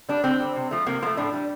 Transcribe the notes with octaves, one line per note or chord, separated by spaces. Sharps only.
G3 D4
D3 C4
G3
C3
F3 A3
C3 A#3
F3 A3 A#3
A2 D4
G3